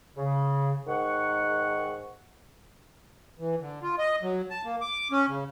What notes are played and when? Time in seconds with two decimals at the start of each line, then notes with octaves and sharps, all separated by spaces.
0.17 C#3
0.87 G#2 D#3 F#5 C#6
3.39 E3
3.60 D3
3.82 F4
3.98 D#5
4.23 F#3
4.50 A5
4.65 A#3
4.81 D6
5.12 C#4
5.28 C#3